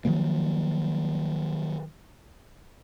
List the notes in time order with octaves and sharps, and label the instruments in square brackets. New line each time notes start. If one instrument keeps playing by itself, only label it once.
[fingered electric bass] D#3 F3 F#3 A#3